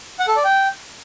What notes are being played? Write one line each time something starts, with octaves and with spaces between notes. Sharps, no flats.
F#5
A4
D5
G5